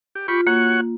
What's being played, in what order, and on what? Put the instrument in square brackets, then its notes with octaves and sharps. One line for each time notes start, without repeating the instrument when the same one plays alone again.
[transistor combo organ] G4
[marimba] F4 [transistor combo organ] G4 B5 C#6
[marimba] A#3 [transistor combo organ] F#4 C#5 F#5